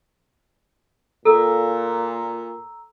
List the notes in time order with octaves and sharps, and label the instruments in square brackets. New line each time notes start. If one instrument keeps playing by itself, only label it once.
[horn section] A#2 [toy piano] A4 [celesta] A#5 E6